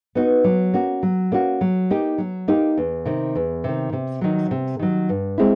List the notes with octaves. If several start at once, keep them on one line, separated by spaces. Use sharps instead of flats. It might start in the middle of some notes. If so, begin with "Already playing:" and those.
B3 D#4 F#4
F#3
A#3 C#4 F#4
F#3
A#3 C#4 F#4
F#3
A#3 D#4 G4
F#3
A#3 D#4 G4
E2
C3 D#3
E2
C3 D#3
C3
D#3 F#3
C3
D#3 F#3
G2
G#3 C4 E4